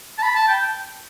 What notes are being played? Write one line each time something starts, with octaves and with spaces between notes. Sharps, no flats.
A5
B5
A5
G5